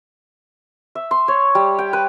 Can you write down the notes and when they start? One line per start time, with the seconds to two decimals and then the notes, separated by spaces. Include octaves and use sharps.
0.95 E5
1.11 C6
1.28 C#5
1.55 G3
1.79 G5
1.93 B4